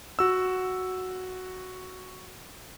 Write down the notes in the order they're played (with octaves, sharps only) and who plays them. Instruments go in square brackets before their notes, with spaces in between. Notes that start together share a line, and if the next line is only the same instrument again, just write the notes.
[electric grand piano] F#4 E6